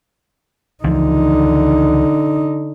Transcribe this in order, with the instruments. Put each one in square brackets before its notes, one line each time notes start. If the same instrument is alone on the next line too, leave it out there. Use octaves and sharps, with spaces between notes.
[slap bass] C#2 E3 F3 [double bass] D3 D#4